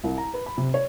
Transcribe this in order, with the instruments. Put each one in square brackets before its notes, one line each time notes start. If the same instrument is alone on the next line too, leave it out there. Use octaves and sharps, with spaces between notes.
[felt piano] C2
A#5
B4
B5
C3
C#5